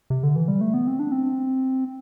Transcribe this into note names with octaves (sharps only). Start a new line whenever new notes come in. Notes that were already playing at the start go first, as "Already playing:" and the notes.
C3
D3
E3
G3
A3
B3
C4
D4
C4